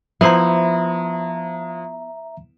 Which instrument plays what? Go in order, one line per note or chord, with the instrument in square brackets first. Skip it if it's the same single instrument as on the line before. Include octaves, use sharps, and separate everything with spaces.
[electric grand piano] F3 [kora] B3 E4 C5 [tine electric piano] E5 A#5